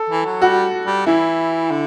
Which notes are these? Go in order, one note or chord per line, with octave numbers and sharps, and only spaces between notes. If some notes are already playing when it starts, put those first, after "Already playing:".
Already playing: A4
E3
F#3
G3 F#4
G3
E3 E4
D3